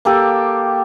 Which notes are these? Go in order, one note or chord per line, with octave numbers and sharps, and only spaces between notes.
A#3 G4 A4